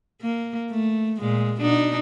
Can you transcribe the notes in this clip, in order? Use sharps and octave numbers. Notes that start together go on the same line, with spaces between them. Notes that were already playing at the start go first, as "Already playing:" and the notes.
A#3
A3
A#2 G#3
B2 D4 D#4